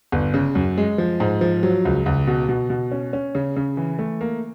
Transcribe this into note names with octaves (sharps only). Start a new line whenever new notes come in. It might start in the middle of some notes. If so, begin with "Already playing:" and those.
G1
C#3
F#2
G#3
F3
G#2
F3
F#3
C#2
C#2
B2
B2
B2
C#4
C#4
C#3
C#3
E3
A3
A#3